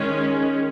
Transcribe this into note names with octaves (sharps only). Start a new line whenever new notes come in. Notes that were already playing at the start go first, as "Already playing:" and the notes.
Already playing: D#3 G#3 C#4